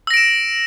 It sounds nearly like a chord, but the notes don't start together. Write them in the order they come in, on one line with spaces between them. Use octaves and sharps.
E6 A#6 D7 E7